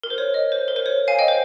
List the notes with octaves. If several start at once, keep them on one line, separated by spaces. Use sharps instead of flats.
A#4
C5
C#5
D#5
C5
A#4
C5
C#5
F5 G#5
D#5 G5
C5